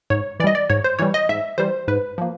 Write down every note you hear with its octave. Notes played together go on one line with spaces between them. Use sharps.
G#2 C#5
E3 G3 D5 D#5
D5
G#2 C#5
C5
E3 G3 C#5
D#5
G#2 E5
E3 G3 C5
G#2 B4
F3 A#3